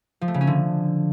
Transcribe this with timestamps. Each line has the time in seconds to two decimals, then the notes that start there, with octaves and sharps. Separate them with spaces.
0.21 F3
0.28 A3
0.34 C#3
0.41 C#4
0.47 D3